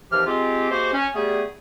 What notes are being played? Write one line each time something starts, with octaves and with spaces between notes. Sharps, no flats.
D#2 C3 E3 F3 G4 F6
G#3 C4 F4 G4
C3 G#3 A#3 F#4 C5
C#4
G3 A3 B3 G#4